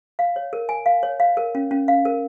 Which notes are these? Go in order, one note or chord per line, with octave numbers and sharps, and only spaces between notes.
F5
C#5
A#4
G#5
F5
C#5
F5
A#4
C#4
C#4
F5
A#4